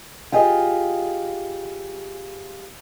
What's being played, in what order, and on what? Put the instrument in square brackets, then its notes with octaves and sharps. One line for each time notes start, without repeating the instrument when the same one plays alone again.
[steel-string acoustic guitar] F4 G4 G#4 D#5